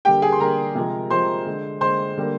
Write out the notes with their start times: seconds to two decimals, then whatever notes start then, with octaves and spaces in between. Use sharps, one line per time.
0.05 D3 G3 A#3 G4 G5
0.22 G#4 G#5
0.32 C6
0.40 D3 G3 A#3 A#4 A#5
0.75 C3 F3 G#3
1.10 C3 F3 G#3 C5 C6
1.46 D3 G#3
1.81 D3 G#3 C5 C6
2.17 D3 G3 A#3